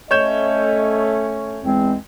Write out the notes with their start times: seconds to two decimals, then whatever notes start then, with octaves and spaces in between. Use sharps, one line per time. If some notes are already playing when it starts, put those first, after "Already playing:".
0.11 A3 C#4 C#5 D#5 G6 E7
1.64 E2 G#3 C4